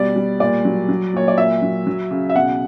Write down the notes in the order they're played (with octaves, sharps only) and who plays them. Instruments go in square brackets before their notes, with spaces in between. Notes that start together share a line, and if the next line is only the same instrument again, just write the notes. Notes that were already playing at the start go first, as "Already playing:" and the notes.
Already playing: [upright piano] B2 G3 D5
G3
A#2 D5
F#3
F#3
A#2 C#5
D5
A#2 E5
F#3
F#3
C#3
E5
B2 F#5